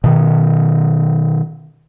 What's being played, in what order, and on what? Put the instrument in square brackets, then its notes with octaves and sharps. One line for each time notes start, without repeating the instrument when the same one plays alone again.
[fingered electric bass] B2 D#3